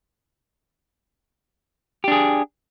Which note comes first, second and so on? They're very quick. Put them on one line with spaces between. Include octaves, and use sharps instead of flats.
G4 D4 G#4